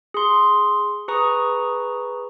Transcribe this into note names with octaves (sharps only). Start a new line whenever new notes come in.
G#4 C6
G#4 B4 A#5 C#6 D#6